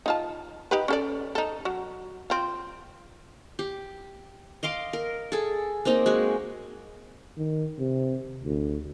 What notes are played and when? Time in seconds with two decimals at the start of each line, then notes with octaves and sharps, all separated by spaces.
0.06 D#4 F4 A5
0.71 D#4 G4 B4
0.88 C#4 A4 D5
1.35 D#4 A4
1.65 F#3
2.30 C4 F4
3.59 G4
4.63 D#5 F5 C6 D6
4.93 A#4
5.32 G#4 A4
5.85 A#3 C4 D#4 A#5
6.06 G#3 F#4
7.37 D#3
7.79 C3
8.43 D2